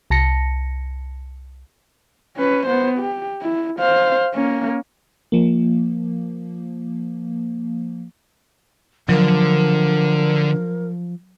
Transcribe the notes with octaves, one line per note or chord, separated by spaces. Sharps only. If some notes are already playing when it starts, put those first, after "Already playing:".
C2 A5 A#6 C#7
C#4 B4
B3 C5
G4
E4
C5 F5
A#3 C#4
F3 A#3
D3 F3 F#3 A#4